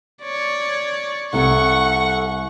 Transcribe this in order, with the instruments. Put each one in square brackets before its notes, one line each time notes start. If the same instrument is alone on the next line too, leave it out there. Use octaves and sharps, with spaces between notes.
[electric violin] C#5 D5
[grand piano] C2 [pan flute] A4 [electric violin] F#5 C#6